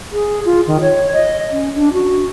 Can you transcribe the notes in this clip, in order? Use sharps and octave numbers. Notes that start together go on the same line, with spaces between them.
G#4
F4
D#3
C#5
D#5
C#4
D4
F#4